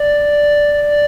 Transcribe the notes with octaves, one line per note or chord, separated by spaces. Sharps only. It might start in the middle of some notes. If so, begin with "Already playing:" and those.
Already playing: D5
D5